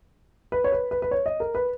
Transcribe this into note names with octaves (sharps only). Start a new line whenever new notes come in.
B4
C#5
B4
B4
B4
C#5
D#5
A#4
B4